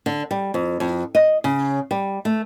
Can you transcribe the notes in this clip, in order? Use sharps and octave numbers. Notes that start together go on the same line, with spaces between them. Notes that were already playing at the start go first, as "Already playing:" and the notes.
D3
G3
F2
F2
D#5
C#3
G3
A3